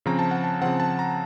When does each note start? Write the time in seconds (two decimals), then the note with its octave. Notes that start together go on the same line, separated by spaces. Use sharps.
0.06 C#3 F3 C4 A#5
0.19 A5
0.31 F#5
0.44 A5
0.62 C#3 F3 C4 F#5
0.80 A5
0.99 A#5